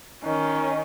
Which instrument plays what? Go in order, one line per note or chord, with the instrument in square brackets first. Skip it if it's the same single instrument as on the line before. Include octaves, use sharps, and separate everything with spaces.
[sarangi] D#3 [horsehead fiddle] C#4